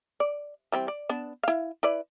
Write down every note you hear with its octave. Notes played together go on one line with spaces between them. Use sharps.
D5
E3 G3 C4
D5
B3 D4
E4 F5
E4 B4 D5